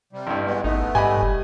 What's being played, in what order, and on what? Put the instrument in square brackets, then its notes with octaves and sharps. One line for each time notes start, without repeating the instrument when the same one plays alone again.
[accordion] C3 G3
[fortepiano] A1 G2
[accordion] E3 G#3 B3
[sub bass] G#1 [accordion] A3 B3 [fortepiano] D#4
[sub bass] G#2 [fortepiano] G3 D#5 B5 [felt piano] G#5
[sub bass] F#1